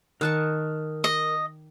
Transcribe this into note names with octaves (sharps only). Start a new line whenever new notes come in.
D#3 A#4 A5 C#6 D#6 F#6
D#5